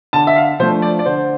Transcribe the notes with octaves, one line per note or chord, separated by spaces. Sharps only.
D3 A5
E5
F5
F3 A3 D4 C5
D5
D5
D3 C5